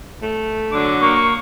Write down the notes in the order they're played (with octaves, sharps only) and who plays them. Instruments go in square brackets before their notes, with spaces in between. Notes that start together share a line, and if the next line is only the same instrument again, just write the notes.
[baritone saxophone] A3
[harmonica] D3 F#3 D6
[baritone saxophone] A#3 [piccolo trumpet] C#6